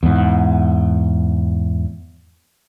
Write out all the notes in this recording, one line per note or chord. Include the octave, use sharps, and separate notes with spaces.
E2 G#2